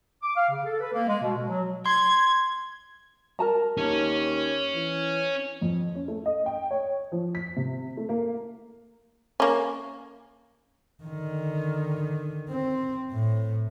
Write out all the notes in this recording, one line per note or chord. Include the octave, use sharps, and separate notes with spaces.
D6
F5
C#3
A4
B4
A#3
G#3
B2
B2
F#3
C6 G#6
A#4 A5 A#5
D#2 C#4
E3
F2
C#4
A3
D#5
G5
C#5
F3
B6
C3
A3
A#3
A#3 C#4
D3 D#3
C4
A2